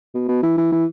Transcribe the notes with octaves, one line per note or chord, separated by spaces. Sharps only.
B2
B2
E3
E3
E3